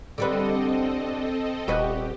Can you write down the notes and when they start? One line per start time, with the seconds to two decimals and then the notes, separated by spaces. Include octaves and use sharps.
0.18 D3 G3 C4 A4 B4 D#5
1.68 D#1 F#4 G4 B4 D#5